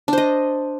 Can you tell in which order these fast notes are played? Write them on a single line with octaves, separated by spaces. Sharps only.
D4 C5 D#5